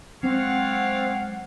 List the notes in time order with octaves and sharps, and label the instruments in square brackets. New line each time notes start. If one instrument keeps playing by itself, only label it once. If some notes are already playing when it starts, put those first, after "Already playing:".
[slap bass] F#3 G#3 [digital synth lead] C4 [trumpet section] C#5 D5 F5 [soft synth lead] F#5